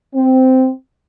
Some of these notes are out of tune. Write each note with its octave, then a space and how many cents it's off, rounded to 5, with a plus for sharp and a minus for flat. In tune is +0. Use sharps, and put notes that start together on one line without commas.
C4 -10